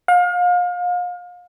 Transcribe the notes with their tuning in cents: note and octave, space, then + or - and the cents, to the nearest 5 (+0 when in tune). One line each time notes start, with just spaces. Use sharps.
F5 +35